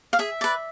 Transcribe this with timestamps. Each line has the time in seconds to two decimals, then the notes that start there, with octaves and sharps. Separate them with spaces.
0.13 F5
0.19 G#4 E5
0.41 B4 D5